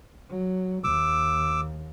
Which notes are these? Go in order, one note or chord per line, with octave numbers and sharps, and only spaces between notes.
F#3
D#2 D6 E6